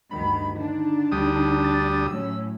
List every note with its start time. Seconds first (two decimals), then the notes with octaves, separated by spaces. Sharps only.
0.11 D2 G2 D#3 B5
0.55 D3 D4 D#4
1.12 D2 G3 D#6
1.64 A6
2.07 A2 F#3 C#4 E6